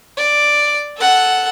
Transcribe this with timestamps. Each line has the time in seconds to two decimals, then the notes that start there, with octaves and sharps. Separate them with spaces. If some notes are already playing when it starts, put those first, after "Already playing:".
0.18 D5
0.97 A4 F#5